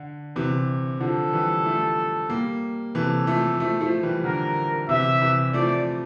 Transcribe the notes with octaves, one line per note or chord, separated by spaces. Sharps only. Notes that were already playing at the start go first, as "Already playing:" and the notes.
Already playing: D3
C3 E3
D3 F3 A4
E3 G3
F3 A3
G3 A#3
C3 E3 A4
F3 A3
F3 A3
F3 A3
E3 G3
D3 A#4
C3 E3 E5
C3 E3
F3 A3 D5